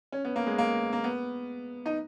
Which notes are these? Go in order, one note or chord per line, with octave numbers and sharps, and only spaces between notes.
C#4
B3
A#3
G#3
A#3
A#3
B3
D#4